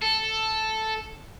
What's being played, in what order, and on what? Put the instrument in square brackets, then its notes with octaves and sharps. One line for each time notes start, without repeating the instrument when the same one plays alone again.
[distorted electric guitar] A4